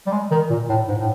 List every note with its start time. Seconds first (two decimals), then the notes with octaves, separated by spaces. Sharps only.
0.07 G3
0.12 G#3
0.31 D#3
0.50 A#2
0.69 A2
0.88 G#2
0.98 A2